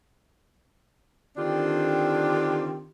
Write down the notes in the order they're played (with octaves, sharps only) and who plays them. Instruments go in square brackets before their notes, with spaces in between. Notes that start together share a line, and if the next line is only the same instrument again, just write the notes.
[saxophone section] D3 D#3 C4 D4 F4 G4